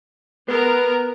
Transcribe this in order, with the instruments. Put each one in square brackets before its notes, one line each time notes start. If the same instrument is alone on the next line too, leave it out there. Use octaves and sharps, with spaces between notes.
[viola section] B3 A#4 [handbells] B4